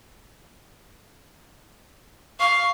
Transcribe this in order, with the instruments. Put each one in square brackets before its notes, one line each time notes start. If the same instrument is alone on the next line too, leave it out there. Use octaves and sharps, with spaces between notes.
[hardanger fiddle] F5 [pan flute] C#6